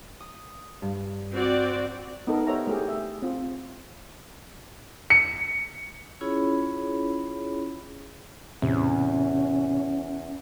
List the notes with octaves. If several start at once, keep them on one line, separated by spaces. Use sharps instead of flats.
D#6
G2
C4 F#4 D5
B3 D#4 A4 A#4
G4 A#4 C5 C#5 E5 A#5
A3 G4 G#4
E5
C4 F4
C#7
C#4 E4 F4 G#4 C#5 B5
E2 A2 C3 C#4